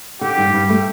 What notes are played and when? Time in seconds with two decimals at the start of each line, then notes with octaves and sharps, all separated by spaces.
0.21 D3 G4
0.38 G2
0.53 G2
0.69 A3